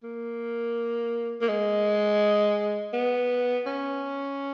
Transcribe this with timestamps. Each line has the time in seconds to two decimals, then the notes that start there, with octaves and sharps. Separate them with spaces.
0.03 A#3
1.41 A#3
1.48 G#3
2.93 B3
3.66 C#4